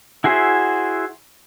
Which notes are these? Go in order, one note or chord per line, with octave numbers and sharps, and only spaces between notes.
E4 F#4 G#4 C5 E5